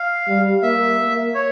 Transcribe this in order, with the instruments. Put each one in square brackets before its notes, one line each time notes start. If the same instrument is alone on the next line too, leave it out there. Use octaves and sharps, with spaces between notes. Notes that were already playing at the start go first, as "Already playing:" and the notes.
Already playing: [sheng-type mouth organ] F5
[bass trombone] G3
[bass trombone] A#3 [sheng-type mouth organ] E5
[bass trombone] A#3
[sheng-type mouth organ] C#5